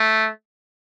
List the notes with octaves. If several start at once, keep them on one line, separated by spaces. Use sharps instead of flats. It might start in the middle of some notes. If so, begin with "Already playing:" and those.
Already playing: A3